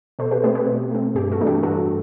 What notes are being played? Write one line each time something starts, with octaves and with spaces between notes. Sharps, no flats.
B2 A4 C5
G4 B4
A3 C4 G4 B4
G4 B4
B2
A3 C4
G2 G4
F#4 A4
E3 A3 D4
G4
G2 F#4 A4